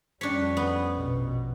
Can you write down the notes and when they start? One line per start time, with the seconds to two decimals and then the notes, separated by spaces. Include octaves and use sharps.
0.21 F2 G3 C#4 D4 C#5 C#6 B6
0.57 B3
0.93 A#1 B2